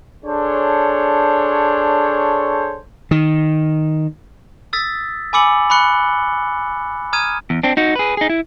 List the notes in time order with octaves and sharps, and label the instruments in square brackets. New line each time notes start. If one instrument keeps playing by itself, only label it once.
[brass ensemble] D4 G#4 A4 C5 C#5
[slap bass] D#3
[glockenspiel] D#6 E6 A6 B6
G#5 B5 D6 E6 C#7 F#7
B5 C#6 F#6 C#7 G7
A#5 D#6 F6 G#6 D#7
[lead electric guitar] E2
C4 D4
D#4 F#4
G#4 B4
D#4 G#4
E4